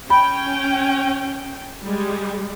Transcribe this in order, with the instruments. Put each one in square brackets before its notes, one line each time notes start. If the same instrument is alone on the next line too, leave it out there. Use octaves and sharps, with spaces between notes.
[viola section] C#4 G5 [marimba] B5
[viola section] G3 G#3